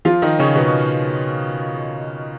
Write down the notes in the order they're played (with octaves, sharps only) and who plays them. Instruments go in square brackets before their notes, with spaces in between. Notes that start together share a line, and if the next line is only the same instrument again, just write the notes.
[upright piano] F3 F4
D#3 D#4
C#3 C#4
B2 B3